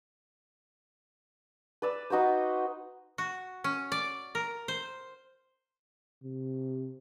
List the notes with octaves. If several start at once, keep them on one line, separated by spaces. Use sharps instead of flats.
B4 D5 E6
D#4 F#4 B4 C5
F#4
C#4
D5
A#4
C5
C3